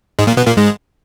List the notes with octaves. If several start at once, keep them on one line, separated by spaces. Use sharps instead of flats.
G#2 G#3
A#2 A#3
B2 B3
A#2 A#3
G#2 G#3